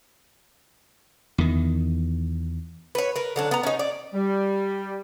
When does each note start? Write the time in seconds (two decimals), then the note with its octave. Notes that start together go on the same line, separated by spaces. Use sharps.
1.38 E2 D#3
2.95 B4 C#5
3.16 A#4 B4
3.36 D3 F#3 D4
3.51 B3 A#5
3.63 C#4 D#4
3.79 D5
4.14 G3